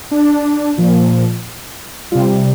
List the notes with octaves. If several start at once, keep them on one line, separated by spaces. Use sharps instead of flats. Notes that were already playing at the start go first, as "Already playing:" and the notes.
D4
A#2 F3
C3 G3 F4